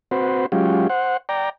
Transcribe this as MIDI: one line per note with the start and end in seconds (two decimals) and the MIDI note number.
0.11 0.46 60
0.11 0.46 66
0.11 0.46 71
0.11 0.46 72
0.52 0.88 54
0.52 0.88 56
0.52 0.88 61
0.52 0.88 65
0.52 0.88 67
0.90 1.17 72
0.90 1.17 78
1.29 1.49 74
1.29 1.49 79
1.29 1.49 82